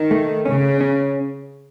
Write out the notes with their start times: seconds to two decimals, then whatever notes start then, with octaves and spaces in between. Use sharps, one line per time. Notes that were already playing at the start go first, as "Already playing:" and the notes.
Already playing: D#3
0.11 A3
0.45 C#3 C#4
0.81 C#4